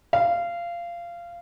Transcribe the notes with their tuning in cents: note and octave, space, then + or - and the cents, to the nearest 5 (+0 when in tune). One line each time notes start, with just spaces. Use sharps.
F5 -20